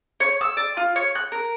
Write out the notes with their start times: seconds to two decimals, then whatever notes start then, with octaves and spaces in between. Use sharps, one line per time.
0.20 C#5
0.41 E6
0.57 D5
0.77 F4
0.96 C#5
1.15 F#6
1.32 A#4